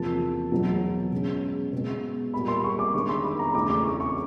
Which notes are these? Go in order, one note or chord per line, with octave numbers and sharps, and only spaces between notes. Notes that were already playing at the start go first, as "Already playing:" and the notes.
Already playing: E2 C3 F3 A#3 A5
E2 B2 F#3 B3
B2 G#3 C#4
B2 G#3 B3
A#2 G3 A#3 B5
C6
C#6
D6
D#3 G#3 B3 D4 C#6
C6
B5
A#5
E2 C#3 E3 A3 D4 D6
D6
C#6
C#6